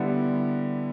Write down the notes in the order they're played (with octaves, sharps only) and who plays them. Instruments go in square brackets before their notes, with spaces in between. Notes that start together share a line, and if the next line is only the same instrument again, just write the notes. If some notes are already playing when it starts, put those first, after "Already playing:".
Already playing: [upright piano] D3 G3 B3 E4